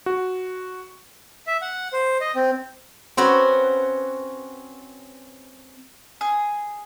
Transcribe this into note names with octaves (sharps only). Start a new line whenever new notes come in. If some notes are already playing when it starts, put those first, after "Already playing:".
F#4
E5
F#5
C5
D#5
C4
C4 C#4 F#4 B4
G#4